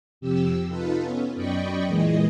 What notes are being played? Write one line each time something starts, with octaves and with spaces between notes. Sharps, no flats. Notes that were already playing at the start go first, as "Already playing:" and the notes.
F2 C3 G4 E6
D#4 F4 A4 B4
B3 C#4
F#2 D5 D#5 G5 B5 C#6
A#2 E3 G#3 G#4 D#5